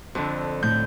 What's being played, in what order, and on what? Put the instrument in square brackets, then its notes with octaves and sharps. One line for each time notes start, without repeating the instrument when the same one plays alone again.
[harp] F2 D3
[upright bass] A2 [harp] G6